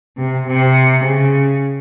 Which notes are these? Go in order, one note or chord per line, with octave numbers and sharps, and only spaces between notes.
C3
C3
C#3